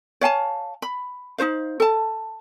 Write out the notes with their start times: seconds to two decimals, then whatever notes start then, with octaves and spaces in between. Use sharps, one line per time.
0.21 C#5 F5 G#5 A5
0.82 B5
1.38 D#4 F4 C5 F5
1.80 A4 A5